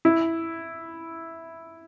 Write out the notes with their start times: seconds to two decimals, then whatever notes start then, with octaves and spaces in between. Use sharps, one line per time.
0.05 E4